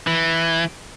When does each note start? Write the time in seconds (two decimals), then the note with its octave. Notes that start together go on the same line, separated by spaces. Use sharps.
0.07 E3